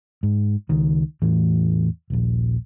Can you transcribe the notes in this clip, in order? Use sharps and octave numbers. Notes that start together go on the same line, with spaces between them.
G#2
C#2 D#3
E2 A2 E3
D#1 A#1